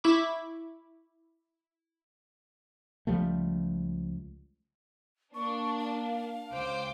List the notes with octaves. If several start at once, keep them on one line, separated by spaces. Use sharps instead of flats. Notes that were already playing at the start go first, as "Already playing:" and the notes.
E4 E5 B5 C#6 D6
C#2 F3 G3 A3
A#3 D4 C#6
F5
C#2 C5 G5 D6